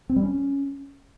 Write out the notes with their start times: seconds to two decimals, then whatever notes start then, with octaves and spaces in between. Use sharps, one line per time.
0.09 C4
0.16 G3
0.23 C#4